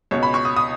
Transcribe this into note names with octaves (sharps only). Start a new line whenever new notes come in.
C#2 B2 C#5
B5
C#6
D#6
D#6